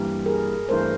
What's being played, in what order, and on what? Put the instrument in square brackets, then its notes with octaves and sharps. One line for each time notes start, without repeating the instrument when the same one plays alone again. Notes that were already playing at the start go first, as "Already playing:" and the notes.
Already playing: [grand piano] G2 E3 G3 A#3
[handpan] G#4 A#4
[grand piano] G2 E3 A3 [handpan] A#4 C5